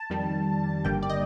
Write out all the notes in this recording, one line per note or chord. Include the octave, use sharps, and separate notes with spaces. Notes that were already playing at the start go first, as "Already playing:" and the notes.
Already playing: A5
F2 D#3 G3
G1 G2 D3 G3 A#3 G5
D5
D#5